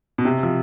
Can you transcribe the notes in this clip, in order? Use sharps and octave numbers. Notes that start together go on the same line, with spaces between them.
B2
C3
F3